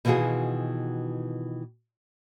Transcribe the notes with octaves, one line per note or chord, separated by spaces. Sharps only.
B2 D#3 E3 F4 F#4 G#4